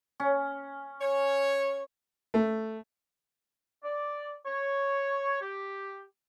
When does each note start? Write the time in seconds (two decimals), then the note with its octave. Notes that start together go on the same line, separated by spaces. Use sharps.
0.20 C#4
1.01 C#5
2.34 A3
3.84 D5
4.46 C#5
5.41 G4